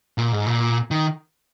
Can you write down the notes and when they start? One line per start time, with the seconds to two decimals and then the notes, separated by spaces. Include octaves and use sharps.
0.18 A#2
0.32 G#2
0.46 A#2
0.91 D#3